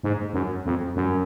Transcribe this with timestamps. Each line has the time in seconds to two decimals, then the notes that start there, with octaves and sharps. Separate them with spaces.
0.03 G#2
0.34 F#2
0.66 F2
0.96 F#2